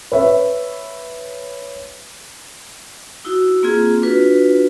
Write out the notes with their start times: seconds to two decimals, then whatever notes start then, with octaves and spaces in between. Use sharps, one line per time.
0.12 B4 C#5 E5
3.24 D#4 E4 F#4
3.63 A#3 C4 F4 G#4
4.02 D4 F4 F#4 B4